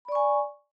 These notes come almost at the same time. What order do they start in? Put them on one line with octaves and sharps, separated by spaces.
B5 D5 C#6 G#5